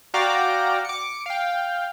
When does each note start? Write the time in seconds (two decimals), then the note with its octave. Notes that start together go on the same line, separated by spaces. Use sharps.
0.14 F#4 D5 F5 G5 A#5 D6
0.85 D6 C#7
1.26 F5 G5